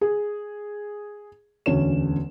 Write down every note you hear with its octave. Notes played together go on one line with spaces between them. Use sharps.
G#4
E1 D2 C#4 C#5 E7